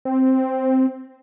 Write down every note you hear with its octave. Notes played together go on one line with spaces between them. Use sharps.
C4